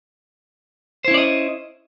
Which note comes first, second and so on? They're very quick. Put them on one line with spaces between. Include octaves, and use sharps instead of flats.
C5 E4 C#4 D5 D#5